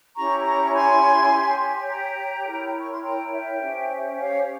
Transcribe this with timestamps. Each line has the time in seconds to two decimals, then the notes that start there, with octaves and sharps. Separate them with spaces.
0.16 C#4 E4 G4 A#5 C#6
0.45 A#5 C#6
0.65 C#6
0.74 G#5 C6
1.31 G4 C#5
1.89 G5 A#5
2.46 E4 A#4 C#5
2.79 C#6
2.91 C6
3.03 G5 A#5
3.32 E5 G5
3.61 C#4 G4 C5
4.18 C#5 F5